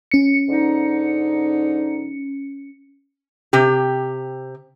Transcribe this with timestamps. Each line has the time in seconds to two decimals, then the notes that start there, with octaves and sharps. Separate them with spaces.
0.12 C#4 C#7
0.49 G#2 D3 D#4
3.53 C3 G4